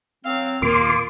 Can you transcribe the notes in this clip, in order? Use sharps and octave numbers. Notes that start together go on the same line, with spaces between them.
F#3 C4 F5
D#2 A#2 A#3 F4 C6 D6